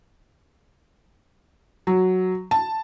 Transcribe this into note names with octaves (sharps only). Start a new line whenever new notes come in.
F#3
A5